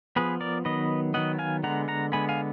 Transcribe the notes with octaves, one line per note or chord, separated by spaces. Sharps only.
F3 B3 G#4 B4
A#4 D5
D#3 F#3 B3 B4 D#5
D#3 F#3 B3 D#5 F#5
F5 G#5
D3 G#3 B3 F#5 A#5
F#5 A#5
D3 G#3 B3 G#5 B5
F5 G#5